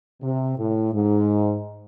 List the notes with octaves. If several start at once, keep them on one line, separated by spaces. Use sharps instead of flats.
C3
A2
G#2